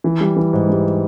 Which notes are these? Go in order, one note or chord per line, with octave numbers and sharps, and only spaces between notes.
E3
G3
E3
G#2
G3